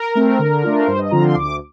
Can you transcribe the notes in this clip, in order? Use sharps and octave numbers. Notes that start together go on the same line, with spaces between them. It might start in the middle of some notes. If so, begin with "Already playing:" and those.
Already playing: A#4
A3 C4
D3
A3 D4 F4
G2 C5
D#5
D3 F3 C4 F4 A#5
C6
D2 D6